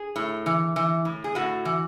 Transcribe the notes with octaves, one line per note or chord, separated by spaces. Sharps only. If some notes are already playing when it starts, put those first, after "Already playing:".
Already playing: G#4
A2
E3
E3
A2
G#4
A2 F#4
E3